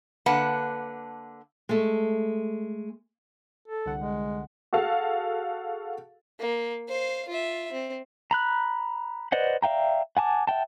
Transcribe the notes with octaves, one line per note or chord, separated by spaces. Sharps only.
D3 A#3 B4 F#5 A5
G#3 A3
A4
C2 D3 F#5
G#3
F#4 G#4 A4 F5
A#3
C5 F5
F4 E5
C4
A#5 B5 F#6
B4 C5 D5 D#5 F#5
D5 E5 F5 G5 A#5
F#5 G#5 A5 D6
E5 F#5 G5 A5